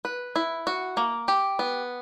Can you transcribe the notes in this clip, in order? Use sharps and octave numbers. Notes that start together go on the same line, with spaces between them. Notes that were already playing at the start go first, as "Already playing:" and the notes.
B4
E4
F#4
A#3
G4
B3